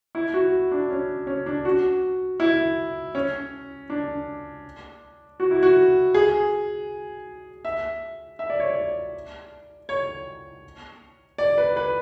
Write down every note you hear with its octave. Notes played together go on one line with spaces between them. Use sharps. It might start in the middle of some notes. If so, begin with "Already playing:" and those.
E4
F#4
D4
C#4
C#4
D4
F#4
E4
C#4
D4
F#4
E4
F#4
G#4
E5
E5
D5
C#5
D5
C#5
D5
B4
B4